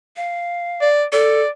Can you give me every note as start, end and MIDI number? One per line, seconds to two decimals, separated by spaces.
0.16 0.89 77
0.81 1.04 74
1.12 1.42 69
1.12 1.49 74